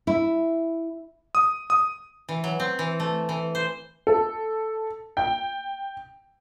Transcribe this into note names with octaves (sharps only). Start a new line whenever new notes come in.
E4
D#6
D#6
E3
F#3
C4
E3
A3
E3
C5
A4
G5